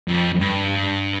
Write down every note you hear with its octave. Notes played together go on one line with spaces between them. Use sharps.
F2
G2